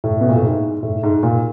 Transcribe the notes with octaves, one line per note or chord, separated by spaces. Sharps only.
A2
B2
A#2
A2
G#2
A2
G#2
A#2